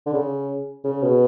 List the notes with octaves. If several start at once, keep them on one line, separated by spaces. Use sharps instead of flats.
D3
C#3
C#3
B2